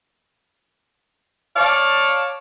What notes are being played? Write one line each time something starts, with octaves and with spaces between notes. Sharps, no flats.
C#5 D5 F5 A5